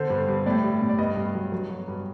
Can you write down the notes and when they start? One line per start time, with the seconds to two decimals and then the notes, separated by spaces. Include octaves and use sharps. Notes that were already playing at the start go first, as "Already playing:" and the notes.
Already playing: D3 C5
0.10 G2
0.29 G2
0.46 A2 D5
0.64 G3
0.81 A2
0.89 D5
0.98 G2 D#5
1.17 G2
1.35 F#3
1.52 F#3
1.69 F#3
1.88 G2